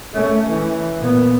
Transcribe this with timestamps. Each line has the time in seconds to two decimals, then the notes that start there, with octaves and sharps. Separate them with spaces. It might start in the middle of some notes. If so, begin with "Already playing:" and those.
0.14 A3 C#4
0.50 E3
0.97 A#2 B3